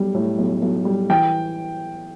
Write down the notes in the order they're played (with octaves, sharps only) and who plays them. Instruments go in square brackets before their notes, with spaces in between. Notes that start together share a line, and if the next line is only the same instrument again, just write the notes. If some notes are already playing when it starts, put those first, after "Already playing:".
Already playing: [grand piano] B1 G3
A2
B1
B1
G3
E3 G5